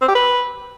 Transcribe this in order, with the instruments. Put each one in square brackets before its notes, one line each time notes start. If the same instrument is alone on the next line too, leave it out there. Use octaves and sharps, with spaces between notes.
[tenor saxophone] C4
G4
B4